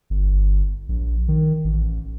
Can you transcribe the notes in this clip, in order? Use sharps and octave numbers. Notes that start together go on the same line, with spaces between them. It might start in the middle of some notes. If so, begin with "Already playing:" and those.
G1
A#1
D#3
A1